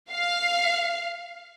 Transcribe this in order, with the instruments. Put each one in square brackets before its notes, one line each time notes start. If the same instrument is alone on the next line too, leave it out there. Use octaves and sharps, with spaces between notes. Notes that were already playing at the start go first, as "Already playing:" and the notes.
[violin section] F5